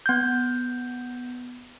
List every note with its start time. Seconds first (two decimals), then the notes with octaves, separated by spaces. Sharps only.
0.06 B3 G6